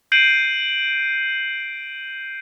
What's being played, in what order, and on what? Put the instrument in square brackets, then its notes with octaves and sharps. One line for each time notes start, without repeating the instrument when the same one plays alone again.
[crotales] G6 C7 D7 D#7 F#7